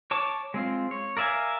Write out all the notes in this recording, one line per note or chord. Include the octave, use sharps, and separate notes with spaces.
C#5 A5 D6
G#3 C4 F4
C#5
A#4 D5 E5 F5 G#5